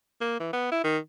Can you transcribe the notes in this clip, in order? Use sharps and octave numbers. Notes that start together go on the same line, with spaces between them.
A#3
E3
B3
E4
D#3